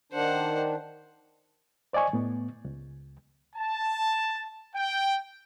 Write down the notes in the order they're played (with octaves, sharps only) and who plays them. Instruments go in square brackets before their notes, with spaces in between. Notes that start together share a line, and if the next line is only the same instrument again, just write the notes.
[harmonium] D#3 D4 [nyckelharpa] C5 F#5
[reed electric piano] C5 D5 D#5 G#5 C#6
A2 B3
C#2
[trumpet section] A5
G5